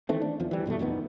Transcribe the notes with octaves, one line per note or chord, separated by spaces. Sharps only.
D#3 E3 A3 C4
D4
E2 F3
E3 G3
G2 B2 G#3 A3
A1 F2 D#3 B3